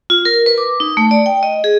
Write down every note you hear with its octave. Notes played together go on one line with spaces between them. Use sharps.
F4
A#4
B4
D6
D#4
A3
D5
G5
D#5
G#4